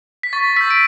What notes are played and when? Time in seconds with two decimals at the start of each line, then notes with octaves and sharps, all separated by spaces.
0.23 B6
0.33 C#6 A6
0.56 E6 G6 B6
0.70 D7